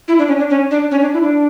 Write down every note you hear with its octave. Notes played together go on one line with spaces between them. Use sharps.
E4
D4
C#4
D4
C#4
D4
C#4
D4
E4
D4